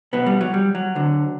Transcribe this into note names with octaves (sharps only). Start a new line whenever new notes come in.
B1 B2 B3
G3
F#3
G3
F#3
D2 D3